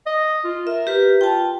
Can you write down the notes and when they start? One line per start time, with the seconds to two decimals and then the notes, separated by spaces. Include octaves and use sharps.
0.06 D#5
0.44 F4
0.67 A#4 E5
0.87 G4 B4
1.21 F4 G5 A5